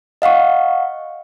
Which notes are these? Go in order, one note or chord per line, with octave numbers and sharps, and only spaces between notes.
D#5 F5 F#5 C#6